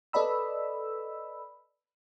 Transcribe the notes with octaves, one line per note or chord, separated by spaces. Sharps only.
A4 B4 D5 D#5 B5 E6